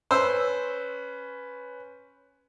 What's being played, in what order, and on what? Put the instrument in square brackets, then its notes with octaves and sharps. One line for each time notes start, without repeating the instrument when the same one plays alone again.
[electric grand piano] C#4 B4 [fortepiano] C5 E6